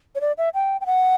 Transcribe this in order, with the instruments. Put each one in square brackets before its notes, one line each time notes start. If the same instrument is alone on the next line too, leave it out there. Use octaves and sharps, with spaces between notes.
[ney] C#5
D5
E5
G5
G5
F#5